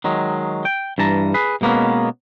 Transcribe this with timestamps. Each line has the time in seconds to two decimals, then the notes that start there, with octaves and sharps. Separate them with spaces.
0.04 D#3 F#3 G#3
0.65 G5
0.98 G2 E3 A5 A#5
1.34 G#4 B4
1.61 B2 G#3 A#3 B3 C#4